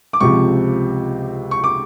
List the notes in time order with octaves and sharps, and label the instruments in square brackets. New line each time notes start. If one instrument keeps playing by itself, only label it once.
[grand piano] D6
C#2 C3 F3 C#6
C#6
D6